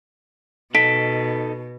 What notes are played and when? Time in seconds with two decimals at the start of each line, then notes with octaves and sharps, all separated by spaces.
0.75 B2 D#4 A4 B6 D7